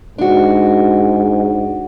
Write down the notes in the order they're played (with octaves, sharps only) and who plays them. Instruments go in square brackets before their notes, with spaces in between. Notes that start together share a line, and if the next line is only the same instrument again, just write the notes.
[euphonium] G#2 [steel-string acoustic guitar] D4 F#4